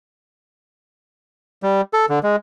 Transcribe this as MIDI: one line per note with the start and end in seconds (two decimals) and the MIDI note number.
1.63 1.81 55
1.93 2.06 69
2.09 2.19 50
2.23 2.36 56